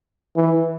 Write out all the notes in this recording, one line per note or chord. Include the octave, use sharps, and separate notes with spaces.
E3